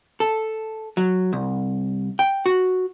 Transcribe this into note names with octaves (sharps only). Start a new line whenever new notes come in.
A4
F#3
C2
G5
F#4